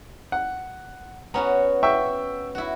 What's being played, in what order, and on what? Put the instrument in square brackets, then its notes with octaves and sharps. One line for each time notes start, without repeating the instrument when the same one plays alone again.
[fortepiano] F#5
[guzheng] B3 C#4 F#4 [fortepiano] A#5
[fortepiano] E5 G5 C#6
[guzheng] E4 F#4